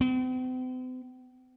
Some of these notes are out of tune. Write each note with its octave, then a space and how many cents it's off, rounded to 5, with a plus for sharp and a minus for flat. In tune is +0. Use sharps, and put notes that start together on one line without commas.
C4 -45